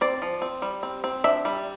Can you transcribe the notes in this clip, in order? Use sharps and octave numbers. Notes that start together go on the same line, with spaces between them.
C4 D5
F3
C4
G3
C4
C4
D4 E5
G3